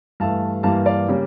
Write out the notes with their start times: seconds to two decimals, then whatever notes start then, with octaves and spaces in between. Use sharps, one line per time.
0.20 G2 E3 A3 F5 A5
0.63 G2 E3 G3 A#3 F5 A5
0.86 D5 F5
1.08 C#3 G3 A#3